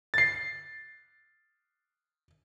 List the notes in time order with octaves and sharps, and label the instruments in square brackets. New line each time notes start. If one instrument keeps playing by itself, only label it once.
[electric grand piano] A6 C7